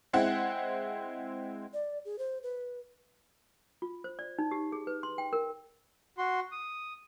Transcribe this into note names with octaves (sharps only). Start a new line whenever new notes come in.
G#3 C4 E4 F#5
D5
G#4
C5
B4
F4
C5
D5
D#4
G4
G#4
B4
C6
G5
A#4
F#4 C6
D#6